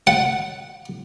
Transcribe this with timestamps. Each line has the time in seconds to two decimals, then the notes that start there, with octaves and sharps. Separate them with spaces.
0.07 F#5